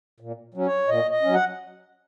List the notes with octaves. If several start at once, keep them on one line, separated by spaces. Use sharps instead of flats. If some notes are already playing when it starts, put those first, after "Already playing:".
A#2
F#3 C#4
C#5
A#2 D#5
D#5
F#3 C#4
F#5